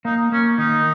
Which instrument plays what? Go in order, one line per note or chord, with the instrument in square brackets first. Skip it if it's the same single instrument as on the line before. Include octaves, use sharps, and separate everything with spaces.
[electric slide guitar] A#3 [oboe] D#4
[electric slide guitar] A#3 [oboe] C#4
[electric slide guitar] D#3 [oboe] D#4